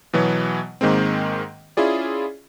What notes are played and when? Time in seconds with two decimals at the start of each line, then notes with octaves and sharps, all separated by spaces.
0.13 B2 E3 F#3 B3
0.81 G#2 D#3 G#3 A#3 C4
1.77 C#4 E4 F4 G#4 D5